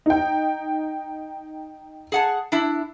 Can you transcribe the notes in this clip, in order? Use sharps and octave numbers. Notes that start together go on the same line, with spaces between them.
D#4 G5
G#4 F#5 A5
D4 E4